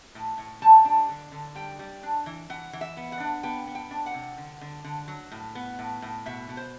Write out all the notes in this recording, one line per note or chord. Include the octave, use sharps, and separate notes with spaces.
A2
A2
G3 A5
D4
D3
D3
G3 G5
G3
D4
E3
E3 F#5
E3
E5
B3
F#5
D4
B3 G5
B3
G5
D4
F#5
C3
D3
D3
D3
F#3
A2
B3
A2
A2
B2 E5
B2
C5